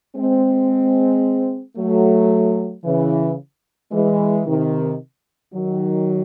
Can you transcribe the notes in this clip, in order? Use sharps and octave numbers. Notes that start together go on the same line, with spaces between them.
G#3 C4
F#3 A3
C#3 E3
E3 G#3
C3 D#3
D#3 F#3